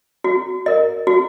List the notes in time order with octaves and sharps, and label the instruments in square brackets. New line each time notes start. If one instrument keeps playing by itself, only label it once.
[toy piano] F#4
A#4 D#5
F#4